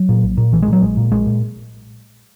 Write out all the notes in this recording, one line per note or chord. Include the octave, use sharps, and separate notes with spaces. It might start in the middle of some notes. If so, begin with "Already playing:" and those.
Already playing: F#3
A#2
A#1
A#2
A#1 E3
G#3
A#2
F#3
A#1 G#3
A#2
A#1 G#3
A#2